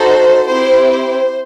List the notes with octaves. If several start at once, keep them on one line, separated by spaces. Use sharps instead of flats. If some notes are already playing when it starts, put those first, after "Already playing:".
Already playing: D#4 F#4 A4 C5
C4 E4 G4 C5
C5